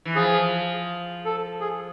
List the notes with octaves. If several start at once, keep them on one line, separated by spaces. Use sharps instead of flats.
E3
F3 G#4
A4
G#4